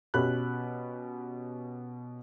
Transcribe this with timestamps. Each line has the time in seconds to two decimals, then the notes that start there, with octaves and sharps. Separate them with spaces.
0.14 B2 C#4 G4 B5 F#6